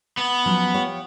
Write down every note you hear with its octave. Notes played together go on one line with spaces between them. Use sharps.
B3
F3 F#3 C#4
F4 G4 C#5